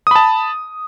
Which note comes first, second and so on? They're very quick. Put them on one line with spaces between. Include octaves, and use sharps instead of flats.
D#6 B5 A5